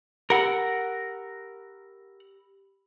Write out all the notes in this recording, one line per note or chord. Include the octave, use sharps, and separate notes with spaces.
G4 A#4 F#5 B5 E6